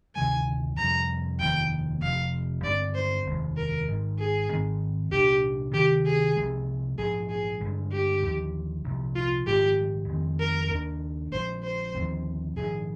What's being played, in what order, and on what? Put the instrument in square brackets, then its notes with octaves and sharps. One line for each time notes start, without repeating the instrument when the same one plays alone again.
[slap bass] D2 C3 D#3 G#3 [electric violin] G#5
[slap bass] F2 C3 G3 [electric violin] A#5
[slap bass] F1 D#2 D#3 A#3 [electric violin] G5
[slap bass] F1 F2 C3 [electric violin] F5
[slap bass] G2 D3 G#3 C4 [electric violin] D5
[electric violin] C5
[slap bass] F1 D#2 D#3 G#3
[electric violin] A#4
[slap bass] G#2 D#3 G#3
[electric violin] G#4
[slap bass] G#2 D#3 G#3 C4
[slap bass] C2 A#2 G#3 D4 [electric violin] G4
[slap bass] D2 C3 D#3 [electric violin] G4
[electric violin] G#4
[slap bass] C2 C3 F3 G#3
[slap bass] A#1 G#2 F3 [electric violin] G#4
[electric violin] G#4
[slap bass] G2 D3 G#3
[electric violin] G4
[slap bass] D#2 D3 F3
C2 A#2 F3
[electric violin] F4
[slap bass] A#1 G#2 D#3 G#3 [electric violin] G4
[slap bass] F2 D#3 G#3 C4
[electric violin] A#4
[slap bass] D#2 D#3 A#3 D4
[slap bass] A#1 A#2 F3 G#3 [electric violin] C5
[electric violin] C5
[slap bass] D#2 D3 F3 C4
[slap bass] A#1 G#2 D#3 [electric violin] G#4